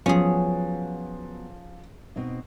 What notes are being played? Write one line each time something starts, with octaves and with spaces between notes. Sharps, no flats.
F3 F#3 B3 C#4 G#4
B2 C4 D#4